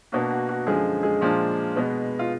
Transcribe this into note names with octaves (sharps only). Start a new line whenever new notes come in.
B2 A#3 D4 F#4
F#4
F#4
F#2 D3 F3 G#3 G#4
G#3 G#4
A#2 F3 A#3 D4
B2 G#3 B3
F4